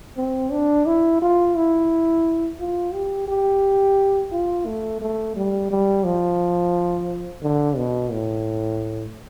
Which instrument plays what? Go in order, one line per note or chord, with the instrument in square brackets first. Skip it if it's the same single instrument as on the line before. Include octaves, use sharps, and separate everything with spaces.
[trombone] C4
D4
E4
F4
E4
F4
G4
G4
F4
A3
A3
G3
G3
F3
D3
B2
A2